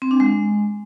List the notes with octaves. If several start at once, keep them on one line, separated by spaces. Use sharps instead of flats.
C4
D4
G#3